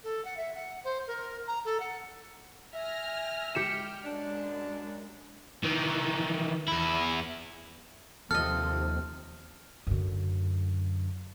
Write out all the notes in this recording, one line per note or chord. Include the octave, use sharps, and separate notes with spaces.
A4
F#5
E5
F#5
C5
A#4
A#5
A4
F#5
E5 G#5 F6 A#6
G#3 G4 G5 F6 C#7 E7
F#2 G#3 D4
D#3 E3
E2 E4
D#2 C3 F3 C4 A4 D#5 F6
F#2 D3